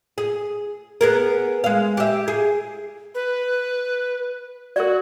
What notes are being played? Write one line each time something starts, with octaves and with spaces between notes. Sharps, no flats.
G#4
B3 G#4 A#4
G#3 F5
G4 E5
G#4
B4
F#4 A#4 D5